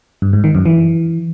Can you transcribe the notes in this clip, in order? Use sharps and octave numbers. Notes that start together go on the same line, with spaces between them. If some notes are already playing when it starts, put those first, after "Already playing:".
G2
G#2
D#3
F#2
E3